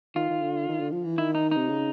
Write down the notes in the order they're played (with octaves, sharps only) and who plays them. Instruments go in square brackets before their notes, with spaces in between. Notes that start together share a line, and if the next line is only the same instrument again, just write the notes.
[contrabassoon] D#3 [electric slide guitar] F4
[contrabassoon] D#3
D3
D#3
D3
F3
E3
[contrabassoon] D#3 [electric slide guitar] E4
[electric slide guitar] D#4
D#4
[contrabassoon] C3
C#3